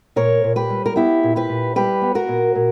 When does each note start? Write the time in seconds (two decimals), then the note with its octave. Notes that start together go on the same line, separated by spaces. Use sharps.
0.16 A#2 A#4 C#5
0.44 A#2
0.56 G4 B4
0.70 G3
0.86 A#4
0.96 B3 E4 G4
1.23 A#2
1.36 G4 B4
1.49 A#2
1.75 G3 G4 B4
2.02 B3
2.15 F#4 A#4
2.28 A#2
2.55 A#2